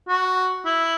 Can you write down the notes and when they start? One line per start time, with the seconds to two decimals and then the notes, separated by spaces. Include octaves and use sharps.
0.08 F#4
0.65 E4